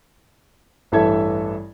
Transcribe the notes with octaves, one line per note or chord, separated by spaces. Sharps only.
A1 G2 E3 A4 E5 G#6